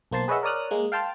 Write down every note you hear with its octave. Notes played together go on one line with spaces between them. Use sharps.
B1 A#3 C5 A5 C7
G#4 B4 C#5 D#5 E5 F#5
A#4 C#5 D5 D#6 F6 F#6
G#3 A#3
F5 G5 A5 C6 F6